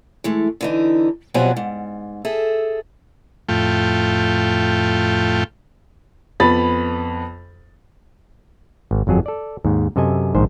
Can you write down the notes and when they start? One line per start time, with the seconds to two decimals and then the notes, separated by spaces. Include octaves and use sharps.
0.24 E3 G#3 A3
0.61 D3 E3 D#4
1.34 F2 B2 F#3 G3 C5 G#5
1.57 G#2
2.25 G#4 A4 E5
3.49 F2 A2 A3 F4 G5
6.40 F2 B3 B5 A6
8.91 G#1
9.07 G1 F2 F#3 G#4 A4
9.26 A4 D5
9.64 D#2 G#2
9.96 F#2 C3 A4 D#5 G#5
10.35 A#1 G#2 D#3 C5